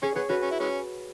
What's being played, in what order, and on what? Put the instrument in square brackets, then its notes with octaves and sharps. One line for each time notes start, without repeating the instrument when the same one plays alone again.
[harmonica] C#4 [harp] G#4 C#5
[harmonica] B3 [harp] G#4 C#5
[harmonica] C#4 [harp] F#4 B4
[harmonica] C#4
E4
E3 G#3 C#4